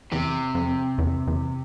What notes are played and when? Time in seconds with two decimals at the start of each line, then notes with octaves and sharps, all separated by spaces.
0.12 E2 C3
0.55 F2
0.98 E2
1.27 E2